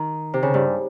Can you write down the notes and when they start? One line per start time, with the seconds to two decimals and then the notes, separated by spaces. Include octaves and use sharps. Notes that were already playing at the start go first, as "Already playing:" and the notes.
Already playing: D#3
0.34 C3
0.43 C#3
0.54 G2